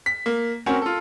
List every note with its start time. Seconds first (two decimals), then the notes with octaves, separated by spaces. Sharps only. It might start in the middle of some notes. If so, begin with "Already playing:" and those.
0.06 B6
0.26 A#3
0.66 C4 C#4 F#4 A#4
0.82 F4 A4